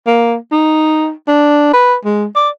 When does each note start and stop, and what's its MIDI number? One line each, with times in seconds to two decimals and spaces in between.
0.07 0.35 58
0.52 1.11 63
1.28 1.72 62
1.73 1.95 71
2.05 2.26 56
2.36 2.49 74